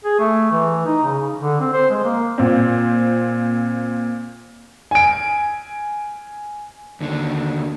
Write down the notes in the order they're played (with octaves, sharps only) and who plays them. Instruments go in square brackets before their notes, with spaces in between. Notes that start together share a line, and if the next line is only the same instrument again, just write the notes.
[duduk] G#4
A3
E3
D#4
C#3
D3
C4
C5
G#3
A#3
[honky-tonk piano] A#2 C4
[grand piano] G#5 D7
[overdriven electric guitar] D#2 D3